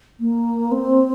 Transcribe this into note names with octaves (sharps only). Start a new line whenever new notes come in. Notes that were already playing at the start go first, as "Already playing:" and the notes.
A#3
C4